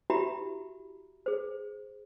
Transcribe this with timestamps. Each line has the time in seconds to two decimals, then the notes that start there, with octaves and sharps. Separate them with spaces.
0.10 E4 F#4 G4 E5 A#5 B5
1.26 G#4 C5